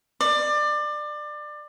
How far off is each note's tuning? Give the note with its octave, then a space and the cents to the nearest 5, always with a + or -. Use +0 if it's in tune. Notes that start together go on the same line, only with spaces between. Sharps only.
D5 +25